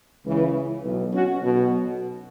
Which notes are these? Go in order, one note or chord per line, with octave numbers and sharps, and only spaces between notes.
C#2 C#3 E3
B1 B2
C#4 F#4
B1 B2